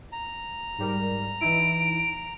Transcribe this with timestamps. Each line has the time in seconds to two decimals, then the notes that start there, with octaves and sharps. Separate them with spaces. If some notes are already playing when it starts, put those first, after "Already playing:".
0.12 A#5
0.78 G#2 G3 A#4
1.41 E3 D#4 E4 D7